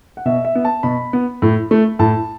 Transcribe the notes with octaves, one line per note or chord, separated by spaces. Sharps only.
F#5
B2 E5
E5
B3
A5
B2 B5
B3
A2
A3
A2 A5